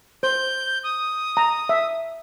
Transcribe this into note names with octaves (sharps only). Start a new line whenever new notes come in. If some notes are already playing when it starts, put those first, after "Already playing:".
C5 G6
D#6
A#5
E5